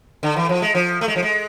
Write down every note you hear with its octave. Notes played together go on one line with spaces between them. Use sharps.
D3
E3
F3
G#3
F3
A3
G#3
F3
G#3